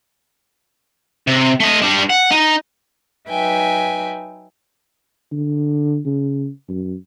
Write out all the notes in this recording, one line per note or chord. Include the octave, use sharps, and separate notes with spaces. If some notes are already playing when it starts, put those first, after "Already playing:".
C3
A3 D#5
G3 D4
F#5
D#4
F#3 D#4 B4 E5 G5 G#5
D3
C#3
F#2